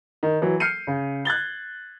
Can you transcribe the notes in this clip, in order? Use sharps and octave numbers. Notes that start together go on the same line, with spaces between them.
D#3
E3 F#3
F6 G6 C7 C#7 D#7
C#3
F#6 G#6 A6 G7